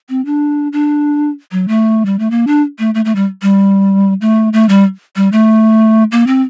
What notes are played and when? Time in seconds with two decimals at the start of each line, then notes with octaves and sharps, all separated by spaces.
0.09 C4
0.25 D4
0.73 D4
1.52 F#3
1.68 A3
2.06 G3
2.19 A3
2.31 A#3
2.47 D4
2.79 A3
2.94 A3
3.05 A3
3.16 G3
3.42 G3
4.21 A3
4.53 A3
4.69 G3
5.16 G3
5.32 A3
6.12 A#3
6.27 C4